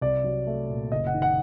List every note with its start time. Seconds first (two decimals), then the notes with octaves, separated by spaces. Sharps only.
0.01 C2 D5
0.24 F#3
0.47 A3
0.70 A#2
0.92 F#1 D#5
1.07 F#5
1.14 D#3
1.22 F#5